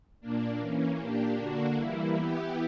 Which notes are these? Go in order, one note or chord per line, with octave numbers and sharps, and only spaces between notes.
A#2 A#3 D4
E3 A#3 C#4
A#2 A#3 D4 G4
D3 A#3 D4 F#4
E3 G3 A#3 E4
E3 B3 E4 G4